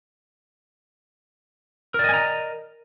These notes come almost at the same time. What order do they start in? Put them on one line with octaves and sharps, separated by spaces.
A#4 D5 D#5 G#5 A#5